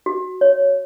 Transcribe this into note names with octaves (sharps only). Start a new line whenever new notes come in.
F#4
C#5